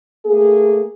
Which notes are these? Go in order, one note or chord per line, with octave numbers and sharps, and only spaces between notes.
A3 A#3 G#4